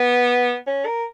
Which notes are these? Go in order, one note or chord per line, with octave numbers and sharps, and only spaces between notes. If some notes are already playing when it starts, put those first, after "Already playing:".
Already playing: B3
C#4
A#4